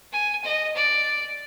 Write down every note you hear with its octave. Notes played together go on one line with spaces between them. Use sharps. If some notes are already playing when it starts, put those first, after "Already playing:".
G#5
D#5
D5